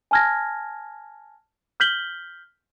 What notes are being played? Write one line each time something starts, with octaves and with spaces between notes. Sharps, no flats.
G#5 A5 F6 G#6 A#6
F6 G6 B6 F#7 G7